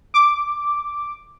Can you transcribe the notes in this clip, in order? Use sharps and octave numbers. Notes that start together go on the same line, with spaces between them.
D6